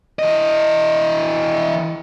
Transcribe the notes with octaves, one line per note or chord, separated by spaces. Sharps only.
E3 D#5